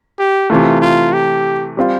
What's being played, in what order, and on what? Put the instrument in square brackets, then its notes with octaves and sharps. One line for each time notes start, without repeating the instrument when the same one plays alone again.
[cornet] G4
[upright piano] C3 E3 A3 [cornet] F4
[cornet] F4
G4
[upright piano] G3 C4 F4